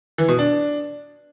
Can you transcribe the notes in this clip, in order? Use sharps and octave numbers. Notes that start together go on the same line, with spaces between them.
E3
B2
D4